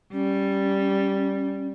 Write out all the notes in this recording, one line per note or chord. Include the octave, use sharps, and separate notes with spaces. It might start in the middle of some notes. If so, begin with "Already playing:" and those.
G3 C#4